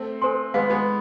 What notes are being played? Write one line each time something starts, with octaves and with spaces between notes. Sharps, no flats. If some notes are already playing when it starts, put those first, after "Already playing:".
Already playing: A3 C4
A4 C5 G#5 C6
G#3 B3 G#4 B4 F5
G#3 B3